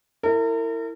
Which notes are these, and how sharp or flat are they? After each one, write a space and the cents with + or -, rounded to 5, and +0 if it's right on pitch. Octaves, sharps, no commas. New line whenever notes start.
E4 +0 A#4 -40